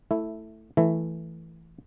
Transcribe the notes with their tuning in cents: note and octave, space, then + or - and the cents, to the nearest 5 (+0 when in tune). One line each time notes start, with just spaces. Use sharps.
A3 +5 E4 +0
E3 +0 A3 +0 E4 +5